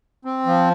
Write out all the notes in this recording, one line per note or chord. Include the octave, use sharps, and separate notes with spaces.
C4
F3